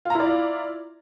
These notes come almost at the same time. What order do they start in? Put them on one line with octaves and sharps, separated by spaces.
F4 A#5 E4 D5